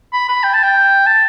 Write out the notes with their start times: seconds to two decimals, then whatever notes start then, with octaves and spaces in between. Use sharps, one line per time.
0.13 B5
0.28 B5
0.43 G5
0.54 A5
0.63 G5
1.06 A5